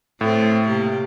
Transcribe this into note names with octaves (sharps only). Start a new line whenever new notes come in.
A2 A3 C4
C3 A#3 G4